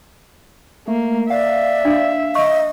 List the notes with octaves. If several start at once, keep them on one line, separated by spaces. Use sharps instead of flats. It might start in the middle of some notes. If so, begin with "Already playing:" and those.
A3 A#3
D5 E5 F5
D4
D#5 C#6